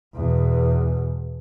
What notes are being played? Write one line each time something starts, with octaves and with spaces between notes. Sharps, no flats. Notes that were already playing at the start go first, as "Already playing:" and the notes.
E2 B2